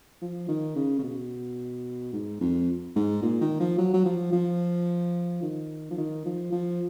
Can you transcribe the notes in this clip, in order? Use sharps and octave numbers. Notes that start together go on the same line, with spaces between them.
F3
D#3
C#3
C#3
B2
G#2
F2
G#2
A#2
D#3
F3
F#3
F#3
F3
F3
D#3
F3
D#3
F3
F3